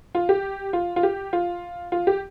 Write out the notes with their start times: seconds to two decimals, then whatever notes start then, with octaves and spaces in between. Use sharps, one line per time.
0.15 F4
0.29 G4
0.73 F4
0.96 F4
1.03 G4
1.33 F4
1.92 F4
2.07 G4